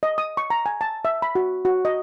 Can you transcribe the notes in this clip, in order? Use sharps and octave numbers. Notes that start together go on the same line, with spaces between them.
D#5
D#6
C#6
A#5
G#5
A5
E5
B5
F#4
F#4
D#5